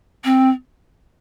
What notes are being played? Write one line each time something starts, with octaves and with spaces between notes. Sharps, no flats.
C4